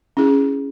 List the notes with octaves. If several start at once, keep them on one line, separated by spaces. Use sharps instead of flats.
C#4 E4 G#4